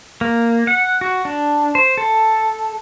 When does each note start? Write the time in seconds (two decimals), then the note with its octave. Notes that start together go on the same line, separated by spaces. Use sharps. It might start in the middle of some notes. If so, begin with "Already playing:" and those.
0.21 A#3
0.67 F#5
1.01 F#4
1.25 D4
1.75 C5
1.98 A4